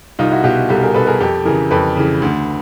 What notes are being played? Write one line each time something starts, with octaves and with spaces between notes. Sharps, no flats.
C2 D#4 F4
E4 F#4
B2 F4 G4
C2 G4 A4
G#4 A#4
B2 A4 B4
G#4 A#4
F2 G4 A4
C#3 E3 G#4 A#4
F2 A4 B4
C#3 E3
D2